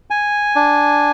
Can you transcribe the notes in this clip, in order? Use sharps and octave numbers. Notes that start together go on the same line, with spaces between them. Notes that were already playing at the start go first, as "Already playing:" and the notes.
G#5
D4